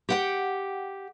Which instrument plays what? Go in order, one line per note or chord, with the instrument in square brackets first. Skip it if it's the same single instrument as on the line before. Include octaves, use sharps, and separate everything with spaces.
[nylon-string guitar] G4 F#5 G5